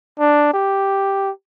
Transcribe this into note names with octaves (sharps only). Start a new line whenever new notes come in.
D4
G4